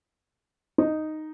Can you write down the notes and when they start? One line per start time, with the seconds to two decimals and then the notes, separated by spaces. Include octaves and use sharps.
0.78 D#4